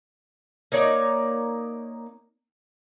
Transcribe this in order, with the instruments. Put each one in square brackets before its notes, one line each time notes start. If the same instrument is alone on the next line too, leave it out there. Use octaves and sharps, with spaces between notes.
[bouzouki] A#3 D#4 C#5 D5